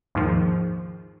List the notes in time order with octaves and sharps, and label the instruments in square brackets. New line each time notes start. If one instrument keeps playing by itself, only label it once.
[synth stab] D#2 G#2 D#3 F3